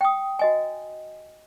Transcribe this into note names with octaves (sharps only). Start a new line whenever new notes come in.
G5 D#6
F#4 D#5 G#5